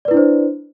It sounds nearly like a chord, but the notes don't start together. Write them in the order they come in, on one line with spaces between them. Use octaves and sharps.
D5 B4 E4 D4 C5